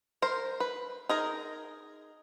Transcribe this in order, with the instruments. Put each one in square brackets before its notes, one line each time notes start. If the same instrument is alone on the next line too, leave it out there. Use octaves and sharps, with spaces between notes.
[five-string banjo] A#4 C5
B4
D#4 G#4 A#4